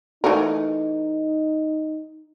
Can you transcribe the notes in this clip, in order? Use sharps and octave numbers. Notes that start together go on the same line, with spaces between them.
E3 A3 D#4 A#4